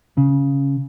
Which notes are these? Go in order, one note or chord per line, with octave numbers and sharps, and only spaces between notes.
C#3